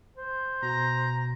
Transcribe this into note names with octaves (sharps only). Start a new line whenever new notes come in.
C5
B2 A#5